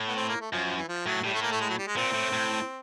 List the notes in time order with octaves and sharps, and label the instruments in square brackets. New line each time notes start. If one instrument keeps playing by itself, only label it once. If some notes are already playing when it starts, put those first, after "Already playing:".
Already playing: [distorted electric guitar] A2
[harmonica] B3
C4
A#3
A3
[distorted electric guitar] F#2 [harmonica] F3
[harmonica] F3
E3
F3
[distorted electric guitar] A2 [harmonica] F#3
[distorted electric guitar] A2 [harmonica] G3
[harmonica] A3
A#3
A3
G#3
F#3
G3
G#3
[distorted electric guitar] A#2 [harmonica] C4
[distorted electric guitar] A2
A2